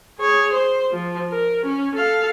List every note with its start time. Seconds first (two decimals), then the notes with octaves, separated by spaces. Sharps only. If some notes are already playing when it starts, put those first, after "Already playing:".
0.19 G#4 C#5
0.53 C5
0.92 F3
1.29 A#4
1.66 C#4
1.96 A4 F5